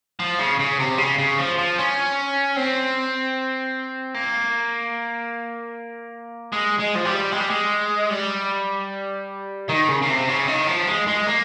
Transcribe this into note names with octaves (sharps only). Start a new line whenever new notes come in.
F3
C#3
C#3
C3
C#3
C#3
F3
F3
C#4
C4
A#3
G#3
G#3
F3
G3
G#3
G3
G#3
G3
D#3
C#3
C#3
C3
C#3
D#3
F3
G#3
G#3
A#3